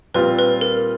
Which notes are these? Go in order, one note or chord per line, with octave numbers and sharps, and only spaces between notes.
A#2 G3 C4 F4 B4
B4
A#4